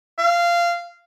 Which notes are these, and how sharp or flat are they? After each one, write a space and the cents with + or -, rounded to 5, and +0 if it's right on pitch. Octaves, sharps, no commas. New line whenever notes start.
F5 -15